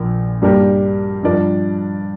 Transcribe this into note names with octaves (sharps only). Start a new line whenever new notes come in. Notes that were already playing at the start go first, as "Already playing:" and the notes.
Already playing: A#1 A#2 A#3 A#4
G2 G3 A#3 G4 A#4
G2 F3 D4 A#4 D5